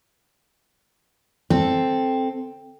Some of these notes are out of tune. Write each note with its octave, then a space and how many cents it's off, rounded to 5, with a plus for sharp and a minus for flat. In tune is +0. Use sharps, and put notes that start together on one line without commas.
C4 +0 A4 +0